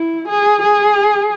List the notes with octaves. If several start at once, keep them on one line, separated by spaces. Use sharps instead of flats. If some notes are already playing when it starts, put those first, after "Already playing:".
Already playing: E4
G#4
G#4